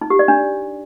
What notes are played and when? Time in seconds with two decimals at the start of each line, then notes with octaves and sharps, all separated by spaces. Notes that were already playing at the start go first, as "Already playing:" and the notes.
0.01 D#4
0.10 G4
0.19 D5
0.28 D4